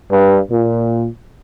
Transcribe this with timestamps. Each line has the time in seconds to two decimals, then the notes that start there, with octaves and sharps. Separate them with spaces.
0.10 G2
0.50 A#2